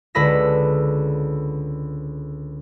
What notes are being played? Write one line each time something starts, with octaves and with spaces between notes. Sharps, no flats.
C#2 D3 B4 B5 E6 A#6